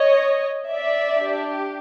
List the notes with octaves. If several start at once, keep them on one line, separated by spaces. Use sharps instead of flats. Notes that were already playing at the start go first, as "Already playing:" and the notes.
Already playing: C#5 D#5
D5 E5
D4 G4